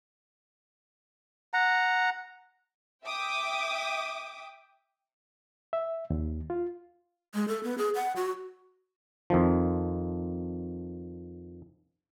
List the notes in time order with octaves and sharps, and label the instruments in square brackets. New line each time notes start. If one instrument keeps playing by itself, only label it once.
[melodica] F#5 A#5
[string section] E5 G5 D6 D#6
[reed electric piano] E5
D#2
F4
[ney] G#3
A4
B3
G#4
F#5
F#4
[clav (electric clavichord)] F2 D#3 F3